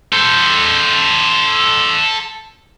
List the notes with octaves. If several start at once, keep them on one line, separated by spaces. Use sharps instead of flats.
A4 C5